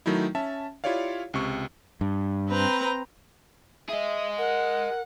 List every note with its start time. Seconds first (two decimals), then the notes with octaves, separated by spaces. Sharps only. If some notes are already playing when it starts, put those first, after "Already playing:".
0.06 D#3 F#3 A3 D#4 E4
0.35 C#4 E5 A5
0.84 E4 F4 G4 C#5 D5 F5
1.34 C#2 C3 C#6
2.01 G2
2.48 C4 B4 A#5
3.89 G#4 D#5 E5
4.38 A#4 F#5